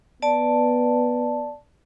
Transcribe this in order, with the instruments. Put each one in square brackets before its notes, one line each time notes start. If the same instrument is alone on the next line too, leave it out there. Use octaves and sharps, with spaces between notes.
[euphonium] B3 [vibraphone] D5 A5